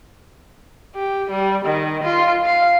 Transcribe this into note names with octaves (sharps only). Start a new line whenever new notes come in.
G4
G3
D#3
F4
F5